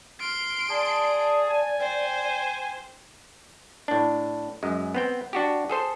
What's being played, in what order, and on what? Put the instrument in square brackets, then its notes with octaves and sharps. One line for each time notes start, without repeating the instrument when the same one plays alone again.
[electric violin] C6 D7 [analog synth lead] F6
[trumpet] G#4 [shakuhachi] D5 [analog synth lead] A5
[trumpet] G#5
[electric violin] C5 [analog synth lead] G5
[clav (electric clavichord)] A2 D4
F#2 G#3
B3 C4 G5
D4 F#4 G4
G#4 A4 C5